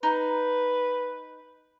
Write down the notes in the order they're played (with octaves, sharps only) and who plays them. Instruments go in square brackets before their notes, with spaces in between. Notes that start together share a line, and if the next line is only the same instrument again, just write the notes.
[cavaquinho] D#4 [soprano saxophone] B4